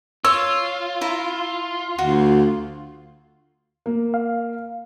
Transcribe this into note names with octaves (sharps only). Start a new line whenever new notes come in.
F4 C#5 E6
E4 A#5
D2 F#4
A#3
F5